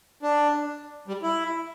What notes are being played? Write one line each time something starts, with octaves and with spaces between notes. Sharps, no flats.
D4
G3
E4